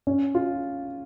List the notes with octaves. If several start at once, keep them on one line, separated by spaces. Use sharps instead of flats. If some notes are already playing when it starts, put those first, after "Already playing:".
C#4
F4